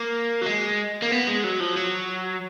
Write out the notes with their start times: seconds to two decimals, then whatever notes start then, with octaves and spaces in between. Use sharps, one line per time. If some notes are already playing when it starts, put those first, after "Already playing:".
Already playing: A#3
0.42 F#3
0.46 G#3
1.02 A#3
1.11 B3
1.27 G#3
1.44 F#3
1.60 F3
1.77 F#3